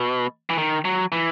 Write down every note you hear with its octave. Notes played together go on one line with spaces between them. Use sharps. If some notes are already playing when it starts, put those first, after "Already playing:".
Already playing: B2
E3
D#3
F#3
E3